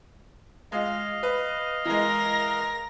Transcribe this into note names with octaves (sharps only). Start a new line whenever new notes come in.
G#3 F4 D#5 F5
B4
E3 G#3 A#4 A#6